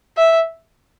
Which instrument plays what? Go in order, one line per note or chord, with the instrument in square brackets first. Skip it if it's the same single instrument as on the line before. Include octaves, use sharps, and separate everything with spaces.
[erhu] E5